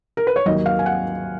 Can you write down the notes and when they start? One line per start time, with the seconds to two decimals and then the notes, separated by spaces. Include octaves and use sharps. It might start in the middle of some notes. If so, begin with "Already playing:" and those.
0.17 A#4
0.27 B4
0.36 C#5
0.46 D#2 D#3 F#3 D#5
0.66 F5
0.79 G#5
0.86 F#5